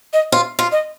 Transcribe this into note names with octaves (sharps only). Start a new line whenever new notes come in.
D#5
F4
F4
D#5